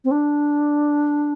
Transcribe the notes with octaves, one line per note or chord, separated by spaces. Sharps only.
C4
D4